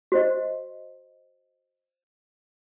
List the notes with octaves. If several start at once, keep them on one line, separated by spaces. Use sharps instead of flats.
F#4 C5 D#5